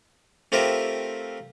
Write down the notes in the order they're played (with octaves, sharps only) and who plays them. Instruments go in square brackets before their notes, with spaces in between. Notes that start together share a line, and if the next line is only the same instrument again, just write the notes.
[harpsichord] A3 C4 F4 G4 A#4 E5